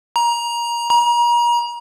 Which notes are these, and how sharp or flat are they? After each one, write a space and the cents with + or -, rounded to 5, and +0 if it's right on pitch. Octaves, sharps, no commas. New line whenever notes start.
A#5 +20
A#5 +35